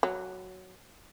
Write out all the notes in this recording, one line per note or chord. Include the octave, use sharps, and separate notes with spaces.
F#3